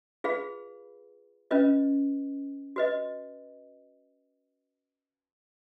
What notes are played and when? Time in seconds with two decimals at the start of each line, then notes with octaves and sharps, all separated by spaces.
0.24 F4 G#4 B4 F5 B5
1.51 C#4 F4 B4 D#5
2.76 F#4 B4 D#5